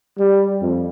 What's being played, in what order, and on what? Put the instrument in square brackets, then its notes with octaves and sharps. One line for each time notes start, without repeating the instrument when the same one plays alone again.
[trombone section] G3
F2